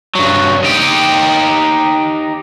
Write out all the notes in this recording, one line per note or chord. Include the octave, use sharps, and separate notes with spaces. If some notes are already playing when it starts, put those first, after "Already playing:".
G2 F#3
D#4 G4